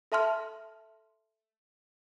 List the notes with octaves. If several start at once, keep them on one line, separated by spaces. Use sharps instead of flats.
A4 E5 A5 C6 F6